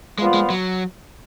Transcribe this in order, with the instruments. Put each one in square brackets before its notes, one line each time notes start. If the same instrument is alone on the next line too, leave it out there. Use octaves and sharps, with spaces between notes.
[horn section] A#2 F3 B3 F4 [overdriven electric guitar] G#3
[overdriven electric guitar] G#3
F#3